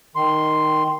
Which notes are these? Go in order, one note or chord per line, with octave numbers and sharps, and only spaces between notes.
D#3 C6